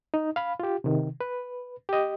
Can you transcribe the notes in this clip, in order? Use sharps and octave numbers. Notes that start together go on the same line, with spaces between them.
D#4
F5 B5
F4 G4
C3 D#3
B4
G4 D#5